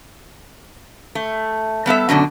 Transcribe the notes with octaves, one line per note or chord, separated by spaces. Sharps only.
A3
G3 B3 A4 E5
F#2 B2 D3 D4